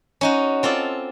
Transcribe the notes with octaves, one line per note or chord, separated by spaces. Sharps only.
C#4 D#4 F#4
C4 F4 A4 D5